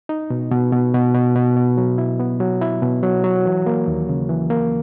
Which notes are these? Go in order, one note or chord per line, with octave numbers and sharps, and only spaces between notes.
D#4
B2
B2
B2
B2
B2
B2
B2
F#3
E4
B3
F#3
E4
B2
F#3
F#3
E3
A#3
D#2
C#3
E3
A#3